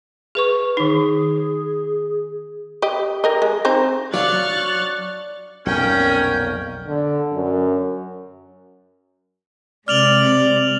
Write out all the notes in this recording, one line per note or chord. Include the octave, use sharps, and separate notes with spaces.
G#4 B4 C#6
D#3 D#4 G#4
G4 D#5
G4 A#4 D#5
G#3
C4 D#4 C5
F#3 D4 F5 C#6 F6 F#6 A6
B1 F2 A#2 C#4 A#4 G5
D3
F#2
C3 G#3 D5 F6 F7 F#7